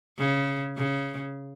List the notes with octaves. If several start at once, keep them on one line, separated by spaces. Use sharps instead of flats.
C#3
C#3